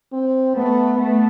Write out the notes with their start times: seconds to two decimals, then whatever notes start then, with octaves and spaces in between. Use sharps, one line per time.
0.12 C4
0.55 A3 B3
0.98 A3 B3